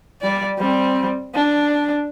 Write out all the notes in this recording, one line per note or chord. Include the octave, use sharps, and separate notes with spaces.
G3 D5
G3 C4
D4